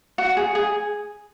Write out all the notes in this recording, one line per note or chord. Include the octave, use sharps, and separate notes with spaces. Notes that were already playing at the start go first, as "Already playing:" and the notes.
F#4
G#4
G#4